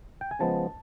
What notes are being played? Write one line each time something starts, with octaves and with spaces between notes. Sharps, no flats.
G5
G#5
C#3 F3 G#3 B3 A5